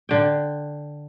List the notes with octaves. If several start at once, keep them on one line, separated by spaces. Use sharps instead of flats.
D3 G5